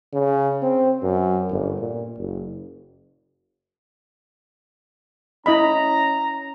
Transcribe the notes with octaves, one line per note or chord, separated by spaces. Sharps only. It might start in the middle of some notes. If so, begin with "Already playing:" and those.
C#3
C4
F#2
G1
A#2
F#1
C#4 E4 D#5 A#5 B5